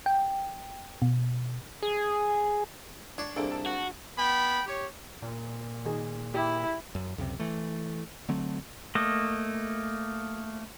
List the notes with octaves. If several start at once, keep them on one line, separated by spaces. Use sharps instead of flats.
G5
B2
G#4
D4 C#5 D5
C2 A#3 D4 G#4 A4 D5 D7
A5
F#4
B3 G5 B5
G4 C#5
A#2
D#3 G#4
E4 G4
F#2
C#2 F#2 C3
E3 A3
D3 F#3 A3 C4
A3 A#3 D#5